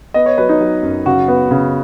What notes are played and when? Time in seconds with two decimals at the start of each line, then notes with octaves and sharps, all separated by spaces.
0.14 B3 D#5
0.26 C#5
0.38 F#3 B4
0.49 D#4
0.61 F#3
0.83 F#2
1.06 C#3 F#4
1.28 B3
1.51 C#3